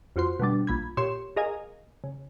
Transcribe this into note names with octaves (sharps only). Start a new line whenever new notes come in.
F2 F4 F#4 C5 C6
B2 D3 G3 D4
A#1 B5 G#6
A#2 G4 C#5 C6 E7
G#4 A#4 D#5 F5 G#5
C#3